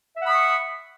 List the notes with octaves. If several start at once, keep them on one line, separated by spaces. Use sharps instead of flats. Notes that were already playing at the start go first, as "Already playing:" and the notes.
E5 F#5 B5 C#6 D#6